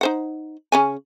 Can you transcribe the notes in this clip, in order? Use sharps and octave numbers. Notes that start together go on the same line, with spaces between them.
D#4 C5 F#5
C#3 C#4 G#5